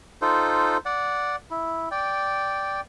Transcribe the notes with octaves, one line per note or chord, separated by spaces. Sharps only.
D#4 F4 A4 C5
D5 F#5
E4
D5 G5